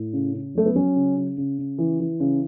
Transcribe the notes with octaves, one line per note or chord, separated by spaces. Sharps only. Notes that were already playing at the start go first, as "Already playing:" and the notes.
Already playing: A2
C#3
C#3
F#3 A3
B3
F#3 C#4
C#3
C#3
C#3
C#3
E3
E3
C#3